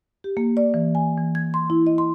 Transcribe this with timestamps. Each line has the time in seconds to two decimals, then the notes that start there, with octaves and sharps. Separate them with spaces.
0.24 G4
0.37 A#3
0.57 D5
0.74 E3
0.95 G#5
1.18 E3
1.35 G#6
1.54 C6
1.70 E4
1.87 D#5
1.98 C6